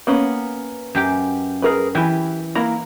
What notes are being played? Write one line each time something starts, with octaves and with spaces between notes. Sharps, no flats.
A#3 B3 C#4
F#2 G4 G5
G#4 A#4 B4
E3 E4 G4
A#3 E4 A#5